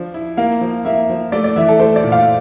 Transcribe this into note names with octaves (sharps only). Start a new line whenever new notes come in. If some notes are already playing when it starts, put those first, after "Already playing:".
Already playing: F3 D4
E4
A#3 F5
F3
A#3 E5
F3
A3 D5
D5
E3 E5
A4
A3 C5
D5
A#2
F5